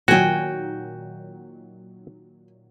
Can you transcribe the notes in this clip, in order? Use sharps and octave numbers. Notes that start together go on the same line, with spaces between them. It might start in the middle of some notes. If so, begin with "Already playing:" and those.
A#2 D#3 F#3 F#4 G5 G#5